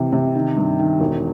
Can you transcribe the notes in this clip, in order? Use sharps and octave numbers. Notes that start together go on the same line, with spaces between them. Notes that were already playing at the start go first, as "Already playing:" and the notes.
Already playing: C3 E3
C3
D#3
G2
D#3
E1